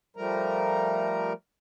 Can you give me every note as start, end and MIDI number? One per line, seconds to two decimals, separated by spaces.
0.16 1.33 53
0.16 1.33 55
0.16 1.33 57
0.16 1.33 70
0.16 1.33 82